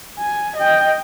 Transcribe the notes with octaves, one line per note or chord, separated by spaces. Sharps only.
G#5
D#5 G5